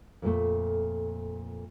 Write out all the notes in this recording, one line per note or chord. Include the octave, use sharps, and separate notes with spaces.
F2 A#2 A3